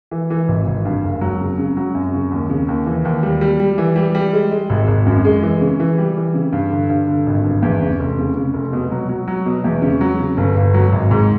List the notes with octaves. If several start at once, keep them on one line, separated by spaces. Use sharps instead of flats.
E3
E3
G#1
G#1
G2
F#1
F#3
C#3
C#3
F#3
F#2
C#3
D#2
C#3
D#2
E3
D#2
G3
G3
G3
E3
G3
G3
G#3
G#3
G#1
G#1
F#2
G#3
E3
C#3
E3
G3
E3
C#3
G2
D3
G2
D3
G#1
G2
E2
C#3
F1
C#3
C#3
F1
B2
F#3
F#3
F#3
B2
E2
C#3
F#3
C#3
G1
G1
F#3
G#1
G#2